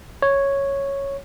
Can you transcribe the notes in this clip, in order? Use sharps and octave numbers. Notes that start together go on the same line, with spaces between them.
C#5